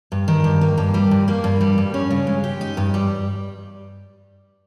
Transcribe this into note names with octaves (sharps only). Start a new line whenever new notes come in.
G2
D#3
G2
A#3
G2
G3
G2
A#3
G2
G3
G2
C#4
C#3
G#3
G4
D#4
G2
G3